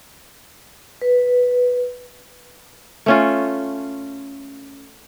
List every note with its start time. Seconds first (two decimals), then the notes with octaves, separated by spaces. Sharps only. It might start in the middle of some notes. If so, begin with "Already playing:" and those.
1.02 B4
3.06 A3 C#4 F4